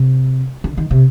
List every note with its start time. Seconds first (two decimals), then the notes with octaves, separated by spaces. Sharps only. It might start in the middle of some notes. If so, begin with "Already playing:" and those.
Already playing: C3
0.64 D3
0.77 D#3
0.91 C3